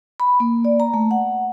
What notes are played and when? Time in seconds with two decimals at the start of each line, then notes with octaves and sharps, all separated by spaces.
0.20 B5
0.40 A#3
0.65 D5
0.80 A#5
0.94 A3
1.11 F#5